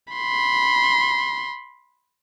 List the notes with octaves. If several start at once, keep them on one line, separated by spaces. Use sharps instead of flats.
B5 C6